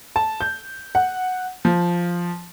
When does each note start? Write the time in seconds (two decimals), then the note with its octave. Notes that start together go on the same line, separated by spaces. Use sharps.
0.16 A5
0.41 G6
0.95 F#5
1.65 F3